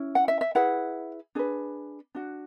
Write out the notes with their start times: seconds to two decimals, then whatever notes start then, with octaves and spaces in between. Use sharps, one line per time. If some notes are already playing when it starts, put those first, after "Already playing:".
Already playing: C#4 E4
0.15 F#5
0.28 E5
0.41 E5
0.55 E4 G#4 B4 F#5
1.35 D4 G#4 B4
2.15 D4 F#4